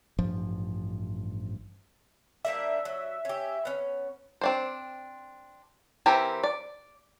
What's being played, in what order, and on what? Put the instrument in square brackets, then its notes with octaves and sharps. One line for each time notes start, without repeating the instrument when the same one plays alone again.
[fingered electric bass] A1 G2 F3
[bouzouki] G3 A#3 D4 [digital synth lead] E5
[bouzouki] F#3
C#4 G4
B3 C#4
[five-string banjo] C4 D4 C5
E3 C4 E4 G4 A#4
D5